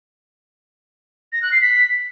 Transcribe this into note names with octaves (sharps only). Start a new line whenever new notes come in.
A#6
F#6
C7
B6